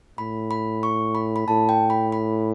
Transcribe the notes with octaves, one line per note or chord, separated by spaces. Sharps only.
A2 B5
B5
C#6
B5
B5
A2 A5
G5
B5
B5